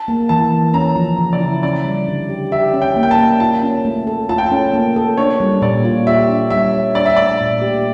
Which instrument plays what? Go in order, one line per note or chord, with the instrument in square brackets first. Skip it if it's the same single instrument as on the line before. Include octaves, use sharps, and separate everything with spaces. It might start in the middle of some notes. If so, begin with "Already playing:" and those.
Already playing: [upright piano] A5
[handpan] A#3
[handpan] E3 [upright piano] A5
[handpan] E3
[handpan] C#4 [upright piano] A#5
[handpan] F3
C#3
[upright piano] D5
[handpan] E4
[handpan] C#4 [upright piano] D5
[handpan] G3
D3
G4
[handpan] G4 [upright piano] E5
[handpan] C#4
[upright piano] G5
[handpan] A#3
[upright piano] G5
A5
[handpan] A#3
[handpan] F4 [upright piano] A5
[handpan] C#4
A3
A4
[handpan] F4 [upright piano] A5
[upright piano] G5
A5
[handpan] C#4
A#3
A4
[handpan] D4 [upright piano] C#5
[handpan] G3
[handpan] A#2 [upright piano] D5
[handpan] F4
[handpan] G4 [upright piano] E5
[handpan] D4
[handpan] G3 [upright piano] E5
[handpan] C#5
[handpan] D4 [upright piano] D5
[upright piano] E5
[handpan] A3 [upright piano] D5
[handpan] A#2
G4